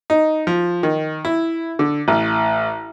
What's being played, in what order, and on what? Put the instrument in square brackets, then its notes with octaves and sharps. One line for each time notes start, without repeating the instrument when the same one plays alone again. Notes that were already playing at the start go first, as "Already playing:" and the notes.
[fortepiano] D#4
F3
D#3
E4
D3
A1